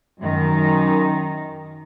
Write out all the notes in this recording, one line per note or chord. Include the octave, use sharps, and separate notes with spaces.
F#2 D#3